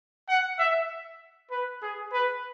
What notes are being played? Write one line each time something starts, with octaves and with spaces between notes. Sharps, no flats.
F#5
E5
B4
G#4
B4